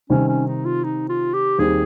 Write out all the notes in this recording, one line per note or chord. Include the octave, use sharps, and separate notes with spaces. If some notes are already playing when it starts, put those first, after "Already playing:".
C3 D#3 G3 C4 C#4
C#4
D#4
F4
D#4
F4
G4
D#2 D#3 G3 C4 G4 G#4